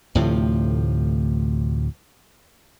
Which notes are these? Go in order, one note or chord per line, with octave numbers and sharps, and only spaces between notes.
D2 A2 C3 F3